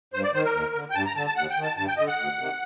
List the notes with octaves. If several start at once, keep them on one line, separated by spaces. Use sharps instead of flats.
G2 C5
D5
D#3 C5
A#4
D#2
D3
G5
G2 A5
A#5
D3 A5
A5
D#2 F#5
G5
D#3
A5
G2 A5
G5
D3 D#5
F#5
D2
C3 D#3